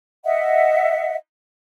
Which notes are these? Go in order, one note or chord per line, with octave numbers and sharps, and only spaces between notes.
D#5 E5 F#5